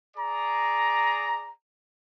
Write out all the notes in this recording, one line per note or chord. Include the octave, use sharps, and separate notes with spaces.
G#4 D5 A#5